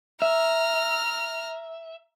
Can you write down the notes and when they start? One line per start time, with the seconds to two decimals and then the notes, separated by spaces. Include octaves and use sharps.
0.22 E5 A#5 F6